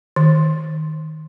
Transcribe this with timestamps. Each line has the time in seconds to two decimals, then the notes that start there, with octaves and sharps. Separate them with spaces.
0.16 D#3